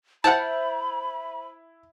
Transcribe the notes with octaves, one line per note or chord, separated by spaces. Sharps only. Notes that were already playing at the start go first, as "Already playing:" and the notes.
E4 C5 E5 F#5 A5 B5 G6